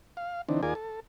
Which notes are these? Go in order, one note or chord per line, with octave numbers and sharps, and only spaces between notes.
F5
D3 E3 C4 D4 D#4
D#2 F4 G#4 A#4 D5 G#5
A4